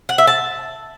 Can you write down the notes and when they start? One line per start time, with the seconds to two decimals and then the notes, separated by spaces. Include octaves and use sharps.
0.09 F#5
0.18 E5
0.27 A5